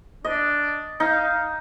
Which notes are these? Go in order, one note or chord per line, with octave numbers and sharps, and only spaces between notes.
D4 D#5
D#4 F5